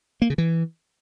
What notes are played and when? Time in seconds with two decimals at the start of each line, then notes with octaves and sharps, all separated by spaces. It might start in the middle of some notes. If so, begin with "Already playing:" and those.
0.22 A#3
0.30 C#3
0.38 E3